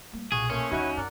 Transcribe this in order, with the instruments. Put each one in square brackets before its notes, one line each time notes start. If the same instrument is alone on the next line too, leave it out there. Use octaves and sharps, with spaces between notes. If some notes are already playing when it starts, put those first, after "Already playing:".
[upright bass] G3 A#3
[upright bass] B1 A#2 [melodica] F#4 [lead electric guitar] G#4
[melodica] A3 G#4 C6 [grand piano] A#3 [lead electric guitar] C#4
[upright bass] D#2 D3 [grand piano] D#4 F#4 E5 [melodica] E4 C#5 F#5
[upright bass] F#2 [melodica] A#4 D5 F#5